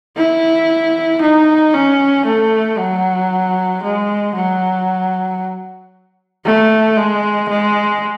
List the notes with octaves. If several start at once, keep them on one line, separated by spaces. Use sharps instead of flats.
E4
D#4
C#4
A3
F#3
G#3
F#3
A3
G#3
G#3